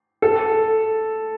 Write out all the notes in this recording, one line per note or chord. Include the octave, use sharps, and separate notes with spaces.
A4